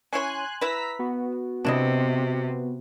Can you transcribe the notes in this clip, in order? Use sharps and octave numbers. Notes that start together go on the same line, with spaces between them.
C#4 E4 C#5 G#5 C6 F#6
E4 B4 A#5 E6 B6
B3 F#4
C3 D4 E4 D#5